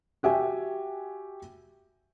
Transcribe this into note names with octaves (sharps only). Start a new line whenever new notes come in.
F#4 G4 E5 G#5